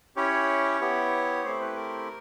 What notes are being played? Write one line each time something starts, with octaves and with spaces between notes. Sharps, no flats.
C#4 E4 G4 C#5
B3 E4 G4
A3 C4 E4 G4 C5
B4
A#4